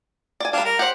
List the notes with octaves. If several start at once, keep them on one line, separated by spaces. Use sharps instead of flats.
D5 G#5
G3 D4 F5 A5 B5
A#4
G4 C5 F#5